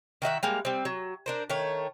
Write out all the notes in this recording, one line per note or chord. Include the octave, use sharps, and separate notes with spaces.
D#3 F#4 E5 F#5
G3 G#3 A#3
G3 C4
F#3
D4 A#4 C5
D#3 A3 C#5